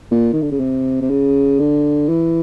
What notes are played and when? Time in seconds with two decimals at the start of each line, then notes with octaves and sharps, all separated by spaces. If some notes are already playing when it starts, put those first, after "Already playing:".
0.11 A#2
0.33 D#3
0.42 D3
0.51 C#3
0.60 C3
1.01 C3
1.10 C#3
1.59 D3
2.09 E3